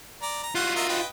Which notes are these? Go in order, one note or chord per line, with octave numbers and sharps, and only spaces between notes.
D5 A#5
A#5
G3 F4 F#4 F#5
A#4 D#5 E5
B4 D#5 G5